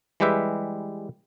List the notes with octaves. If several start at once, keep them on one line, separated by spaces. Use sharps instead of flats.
E3 G3 G#3 G4 B4 E5